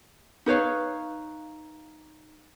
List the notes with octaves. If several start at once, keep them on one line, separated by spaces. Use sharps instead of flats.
D#4 B4 C#5 F5